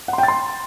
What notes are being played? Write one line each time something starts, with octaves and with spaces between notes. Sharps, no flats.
F#5
C6
G5
A6
C6